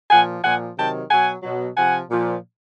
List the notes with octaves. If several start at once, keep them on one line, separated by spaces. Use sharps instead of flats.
A#2 F3 F#5 G#5
A#2 F3 F#5 G#5
C3 D#3 F#3 G5 A5
B2 F#3 F#5 G#5
B2 F#3
C3 F3 F#5 G#5
A#2 F3